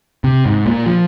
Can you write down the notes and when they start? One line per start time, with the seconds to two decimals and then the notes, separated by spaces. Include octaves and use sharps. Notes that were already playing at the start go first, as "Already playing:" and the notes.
0.24 C3
0.46 G#2
0.66 A#2
0.86 F3